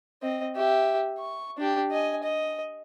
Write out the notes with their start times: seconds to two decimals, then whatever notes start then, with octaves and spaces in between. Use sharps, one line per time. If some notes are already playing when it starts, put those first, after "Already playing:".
0.22 C4 D#5
0.56 G4 E5
1.18 C#6
1.58 D4 G4
1.91 D#5 G#5
2.23 D#5